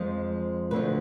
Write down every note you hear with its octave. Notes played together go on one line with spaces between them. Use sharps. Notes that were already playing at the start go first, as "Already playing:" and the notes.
Already playing: F2 F3 G#3
D2 D3 F3 B4